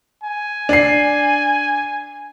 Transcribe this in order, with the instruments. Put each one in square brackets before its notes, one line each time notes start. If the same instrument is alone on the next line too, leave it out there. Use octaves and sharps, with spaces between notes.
[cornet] G#5
[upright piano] D4 C7